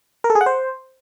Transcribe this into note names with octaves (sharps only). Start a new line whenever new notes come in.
A#4
A4
G#4
F#5
C5